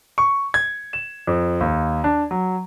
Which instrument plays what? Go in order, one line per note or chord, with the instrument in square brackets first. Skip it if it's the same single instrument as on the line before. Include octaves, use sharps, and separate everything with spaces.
[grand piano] C#6
G#6
E7
F2
D#2
D4
F#3